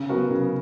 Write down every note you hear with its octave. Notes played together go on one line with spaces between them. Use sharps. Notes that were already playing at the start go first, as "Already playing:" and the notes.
Already playing: C#3
F#3 B3 F#4 A#4
C#3